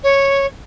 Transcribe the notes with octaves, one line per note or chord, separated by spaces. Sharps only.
C#5